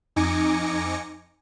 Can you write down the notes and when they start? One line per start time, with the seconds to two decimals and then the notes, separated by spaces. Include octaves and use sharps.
0.16 F2 D#4 G#5 D6 A#6 C#7